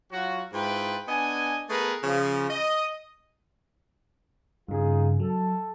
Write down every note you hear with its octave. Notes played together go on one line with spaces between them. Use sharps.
F#3 F4 F#4
G#2 E4 F4 B4 G5
B3 D4 D#5 G#5
A3 B3 G#4 A#4 B4
C#3 F3
D#5
G2 C#3 D#4 F4 G#4
F#3 A4